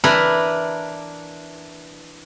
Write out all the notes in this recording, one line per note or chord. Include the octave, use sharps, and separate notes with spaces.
E3 D4 E4 A#4 B4